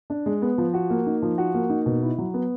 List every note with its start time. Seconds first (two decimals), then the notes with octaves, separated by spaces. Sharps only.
0.10 D4
0.26 G#3
0.42 B3
0.58 F3
0.74 F#4
0.90 A#3
1.06 D#4
1.23 F3
1.38 F#4
1.54 A#3
1.70 D#4
1.86 B2
2.02 E4
2.18 F#3
2.34 B3